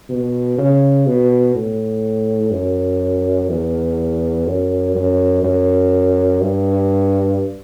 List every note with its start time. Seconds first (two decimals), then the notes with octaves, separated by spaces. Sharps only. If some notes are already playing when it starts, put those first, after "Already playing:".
0.09 B2
0.58 C#3
1.06 B2
1.55 A2
2.52 F#2
3.49 E2
4.47 F#2
4.95 F#2
5.43 F#2
6.41 G2